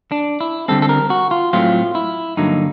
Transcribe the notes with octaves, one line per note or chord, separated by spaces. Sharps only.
D4
E4
D3 G3 C4 A4
A4
A#4
F#4
F4
A2 F#3 A3 C4 F4
E4
G2 D3 F#3 A#3 D#4